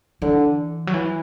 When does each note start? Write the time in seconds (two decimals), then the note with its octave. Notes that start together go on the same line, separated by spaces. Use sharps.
0.22 D3 E3
0.87 F#3
0.94 E3